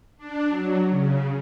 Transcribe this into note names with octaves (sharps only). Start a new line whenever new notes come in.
D4
F#3
C#3